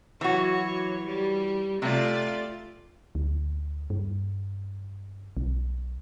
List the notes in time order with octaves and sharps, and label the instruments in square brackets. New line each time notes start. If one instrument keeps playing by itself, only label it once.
[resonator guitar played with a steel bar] E3 F#4 [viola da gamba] F#3 C#5
[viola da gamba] G3
[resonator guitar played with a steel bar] C3 [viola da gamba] A3 F4 D5
[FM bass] D2
G2
B1